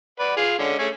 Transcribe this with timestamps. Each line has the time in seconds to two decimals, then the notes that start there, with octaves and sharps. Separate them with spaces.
0.20 B4 D5 F#5
0.37 F4 G#4 F5
0.59 D3 G#3 C#4
0.79 A3 C#4 G#4